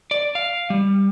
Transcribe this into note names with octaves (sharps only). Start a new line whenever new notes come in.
D5
F5
G3